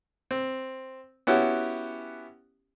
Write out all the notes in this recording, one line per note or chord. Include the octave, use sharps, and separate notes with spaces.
C4
B3 C#4 E4 F#4 G4